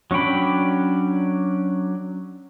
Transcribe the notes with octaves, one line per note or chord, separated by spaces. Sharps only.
F#3 C#4 D4 G5 B5